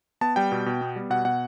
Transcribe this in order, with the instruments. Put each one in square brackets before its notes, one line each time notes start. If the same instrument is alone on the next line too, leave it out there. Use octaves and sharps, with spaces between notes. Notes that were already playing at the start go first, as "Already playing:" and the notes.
[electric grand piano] B3 A5
G3 G5
B2
B2
B3
G3
B2 F#5
B2 F#5